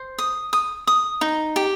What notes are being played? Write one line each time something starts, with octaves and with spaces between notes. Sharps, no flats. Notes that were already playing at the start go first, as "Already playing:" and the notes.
Already playing: C5
D#6
D#6
D#6
D#4
G4